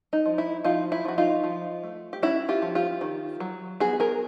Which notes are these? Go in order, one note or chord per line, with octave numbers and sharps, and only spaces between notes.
D#4
F3
E4
F3 D#4 F4
E4
F3 F#4
D#4 F4
F3
A3
G4
C#4 E4 F#4
F4 G4
F3
F4 G4
D#3
F#3
B3 F#4 G#4
G#4 A#4